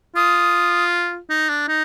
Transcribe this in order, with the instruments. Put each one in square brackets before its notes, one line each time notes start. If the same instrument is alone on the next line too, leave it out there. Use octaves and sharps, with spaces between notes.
[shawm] F4 [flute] D#6
[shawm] D#4
D4
D#4